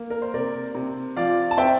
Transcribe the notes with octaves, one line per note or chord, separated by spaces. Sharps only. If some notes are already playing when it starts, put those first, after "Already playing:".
Already playing: A#3
A#4
C5
C3 A#4 D5
C3
F3 D5 F5
A5
C4 E5 G5